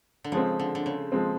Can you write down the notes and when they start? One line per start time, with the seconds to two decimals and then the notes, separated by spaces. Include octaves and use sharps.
0.24 D3
0.32 C#3 F3 G#3 C4
0.60 D3
0.75 D3
0.86 C#3
1.12 F3 G#3 C4